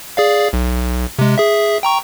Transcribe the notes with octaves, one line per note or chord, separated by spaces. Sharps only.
G#4 D5 F5
B1
C3 G#3
G#4 E5
G5 A#5 C#6